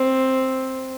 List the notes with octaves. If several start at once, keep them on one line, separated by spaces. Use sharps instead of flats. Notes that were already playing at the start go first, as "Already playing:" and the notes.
Already playing: C4